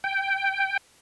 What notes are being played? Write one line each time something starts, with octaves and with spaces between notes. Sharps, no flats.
G5